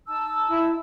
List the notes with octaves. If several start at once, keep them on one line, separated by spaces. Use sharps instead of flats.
D#4 A5 E6
E4